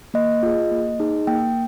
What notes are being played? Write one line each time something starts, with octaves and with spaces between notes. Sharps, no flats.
A#3 D#5
F4 G#4
A#3
D#4 G#4
A#3 G5